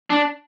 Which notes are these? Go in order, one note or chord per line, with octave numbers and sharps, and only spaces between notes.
D4